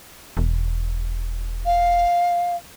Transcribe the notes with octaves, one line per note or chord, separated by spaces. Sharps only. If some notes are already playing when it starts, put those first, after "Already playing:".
E1
F5